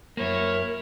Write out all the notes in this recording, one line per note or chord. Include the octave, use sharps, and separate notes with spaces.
F#2 A#3 E4 A#4 C#5